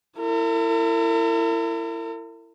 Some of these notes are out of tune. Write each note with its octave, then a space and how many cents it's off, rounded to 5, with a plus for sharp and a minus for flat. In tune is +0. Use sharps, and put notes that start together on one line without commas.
E4 +20 A#4 -45